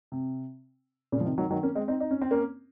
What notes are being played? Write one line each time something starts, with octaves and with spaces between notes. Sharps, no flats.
C3
A#2 C#3
F3
C3 D#3
D#3 F#3
D#3 F#3
A#3 C#4
G#3 C4
C4 D#4
D#4
C#4
C4
A#3 C#4